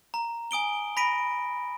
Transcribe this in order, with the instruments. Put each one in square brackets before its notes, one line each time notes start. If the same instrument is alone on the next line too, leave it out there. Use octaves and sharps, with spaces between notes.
[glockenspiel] A#5
G#5 D#6 D7 G7
B5 A#6 B6 D7 D#7